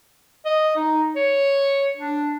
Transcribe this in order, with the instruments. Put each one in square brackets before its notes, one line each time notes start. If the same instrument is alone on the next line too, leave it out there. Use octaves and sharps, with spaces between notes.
[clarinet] D#5
D#4
C#5
D4